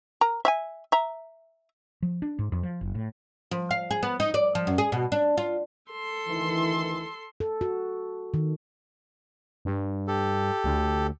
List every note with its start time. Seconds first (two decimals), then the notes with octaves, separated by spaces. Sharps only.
0.21 A#4 A#5
0.45 E5 F5 G#5
0.92 E5 A#5
2.02 F3
2.22 D4
2.39 G#2
2.52 F2
2.63 F3
2.81 F#1
2.95 A2
3.51 F3
3.71 F5
3.91 G#4
4.03 B3
4.20 D#4
4.34 D5
4.55 F3
4.67 F#2
4.78 G#4
4.92 B2
5.12 D4
5.37 F4
5.91 A4 C6
6.28 D2 D#3 E3
7.40 A4
7.61 F#4
8.34 D#3
9.65 G2
10.07 G4 A4
10.64 D2